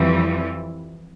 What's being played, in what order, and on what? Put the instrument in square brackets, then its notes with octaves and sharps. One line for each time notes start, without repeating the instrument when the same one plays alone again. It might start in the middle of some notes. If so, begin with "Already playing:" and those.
Already playing: [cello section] F2 E3 G3